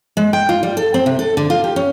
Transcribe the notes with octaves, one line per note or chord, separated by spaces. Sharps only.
G#3
G5
F4
G3
A4
C4
C3
A4
D3
F4
G4
C#4